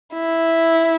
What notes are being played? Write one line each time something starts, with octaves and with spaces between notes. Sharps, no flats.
E4